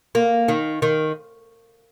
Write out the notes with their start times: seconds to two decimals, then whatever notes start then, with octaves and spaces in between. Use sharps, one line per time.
0.15 A#3
0.48 D#3
0.82 D#3